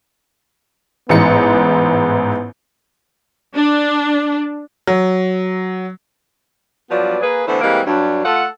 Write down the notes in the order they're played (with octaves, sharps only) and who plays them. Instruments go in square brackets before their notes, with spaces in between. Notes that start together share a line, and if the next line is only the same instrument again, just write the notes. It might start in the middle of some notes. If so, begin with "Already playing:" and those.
[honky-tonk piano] A1 G#2 C#7 [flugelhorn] B3
[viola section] D4
[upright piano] F#3
[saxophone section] G2 F3 F#3 B3 B4 D5
A#3 G#4 B4
D3 E3 A3 B3 C5
E3 G3 G#3 A#3 C4
G2 F#3 D4
A3 F4 A4 F#5